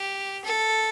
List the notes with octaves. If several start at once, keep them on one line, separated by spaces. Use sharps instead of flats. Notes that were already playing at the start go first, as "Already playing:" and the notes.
Already playing: G4
A4